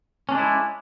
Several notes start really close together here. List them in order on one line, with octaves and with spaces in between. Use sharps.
C#4 D4 G#3 E4